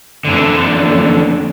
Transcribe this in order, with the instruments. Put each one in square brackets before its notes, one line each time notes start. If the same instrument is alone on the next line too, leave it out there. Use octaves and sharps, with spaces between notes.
[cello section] F2 A#3 D4 [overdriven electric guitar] D3 E3